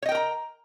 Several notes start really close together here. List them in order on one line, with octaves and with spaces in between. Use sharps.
C#5 D#5 G5 A#4 A#5